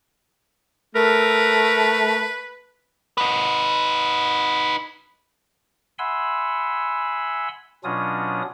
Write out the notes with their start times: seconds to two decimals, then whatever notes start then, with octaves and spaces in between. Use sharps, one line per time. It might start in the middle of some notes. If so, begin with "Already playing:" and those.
0.95 A3 A#4 B4
3.18 D#4 B4
5.99 E5 F#5 G#5 B5 C6 E6
7.84 B2 F#3 C#4 D4 F4 D#6